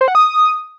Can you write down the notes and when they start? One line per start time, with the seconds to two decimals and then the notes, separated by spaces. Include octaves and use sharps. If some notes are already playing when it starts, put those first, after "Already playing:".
0.01 C5
0.08 F#5
0.15 D#6